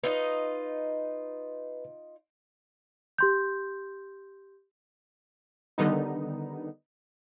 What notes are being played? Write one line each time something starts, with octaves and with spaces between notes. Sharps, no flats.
D#4 F4 B4 D#5
G4 C6 G6
D3 D#3 G3 B3 D#4